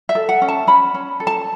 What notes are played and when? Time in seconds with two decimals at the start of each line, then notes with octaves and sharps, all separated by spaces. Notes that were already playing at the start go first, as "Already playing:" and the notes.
0.09 E5
0.15 A4
0.29 F#5
0.42 C#4
0.49 A5
0.67 C#4 B5
0.94 C#4
1.20 A4
1.27 A5